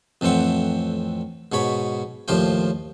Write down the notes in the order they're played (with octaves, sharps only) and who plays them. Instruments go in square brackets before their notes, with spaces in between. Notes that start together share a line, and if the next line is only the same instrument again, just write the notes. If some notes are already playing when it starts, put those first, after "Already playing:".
[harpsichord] F2 A2 E3 C4 F#5
G#2 B2 C#5 B5
D#2 A2 F3 F4 D5 G5